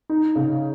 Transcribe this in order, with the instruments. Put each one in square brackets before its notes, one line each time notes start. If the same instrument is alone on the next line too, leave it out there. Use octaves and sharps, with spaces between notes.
[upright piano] D#4
C#3